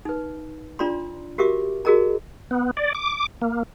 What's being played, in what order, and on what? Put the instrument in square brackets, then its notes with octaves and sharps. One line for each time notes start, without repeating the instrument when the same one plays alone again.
[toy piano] D#4 B4
D4 F4 D5 A#5 C6
F#4 G4 A#4 E5 D6
F#4 G#4 A#4 D#5 A#5
[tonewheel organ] B3
D5
D6
A#3